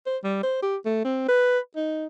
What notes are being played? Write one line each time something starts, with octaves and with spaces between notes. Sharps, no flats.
C5
G3
C5
G4
A3
C4
B4
D#4